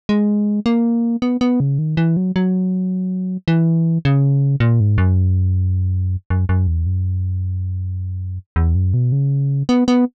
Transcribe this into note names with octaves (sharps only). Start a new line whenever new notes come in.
G#3
A#3
B3
B3
C#3
D#3
E3
F#3
F#3
E3
C#3
A#2
G#2
F#2
F#2
F#2
E2
F#2
E2
F#2
B2
C#3
B3
B3